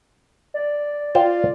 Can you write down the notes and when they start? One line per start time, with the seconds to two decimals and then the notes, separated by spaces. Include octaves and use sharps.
0.54 D5
1.15 F4 C5 F5 G5